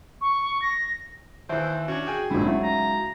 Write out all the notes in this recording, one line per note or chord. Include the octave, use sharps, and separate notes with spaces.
C#6
A#6
D#2 E3 C5 E5
C#4 D4 F#4
G#4 G5 G#5
A#1 D3 G#3 D#4 E4 F#4
C#3 F#3 A3 E4
A#5